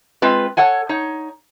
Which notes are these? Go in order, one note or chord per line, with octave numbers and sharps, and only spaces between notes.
G#3 C4 F4 B4
A4 C#5 F#5 G#5
D#4 C#5